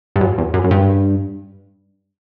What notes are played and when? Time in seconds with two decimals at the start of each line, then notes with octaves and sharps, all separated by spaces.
0.16 G2
0.21 F#2
0.38 E2
0.54 F#2
0.64 F#2
0.71 G2